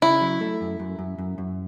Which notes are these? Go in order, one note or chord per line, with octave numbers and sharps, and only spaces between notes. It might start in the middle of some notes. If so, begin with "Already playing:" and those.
C#3 E4
F#3
A3
F#2
F#2
F#2
F#2
F#2